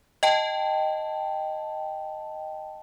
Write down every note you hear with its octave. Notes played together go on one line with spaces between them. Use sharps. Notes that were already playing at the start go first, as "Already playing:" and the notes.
D#5 G5 A5